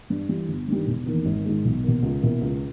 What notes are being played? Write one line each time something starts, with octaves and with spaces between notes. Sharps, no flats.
G2
E3 G3
G1
G2 D#3 G3
E1
E2 D#3 A#3
G#1
G#2 D#3 G#3
B1
B2 A#3
C#2
B2 A#3 E4
C#2